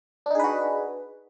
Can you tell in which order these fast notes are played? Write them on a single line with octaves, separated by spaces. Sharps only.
D4 D#4 G#4 B4 F#4